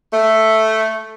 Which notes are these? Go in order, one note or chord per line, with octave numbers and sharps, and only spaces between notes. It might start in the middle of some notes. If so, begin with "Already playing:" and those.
A3